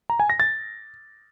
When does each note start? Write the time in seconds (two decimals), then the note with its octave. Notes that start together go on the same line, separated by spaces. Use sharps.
0.10 A#5
0.20 G#5
0.30 A#6
0.40 A6